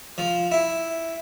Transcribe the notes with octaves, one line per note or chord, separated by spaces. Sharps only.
F3
E4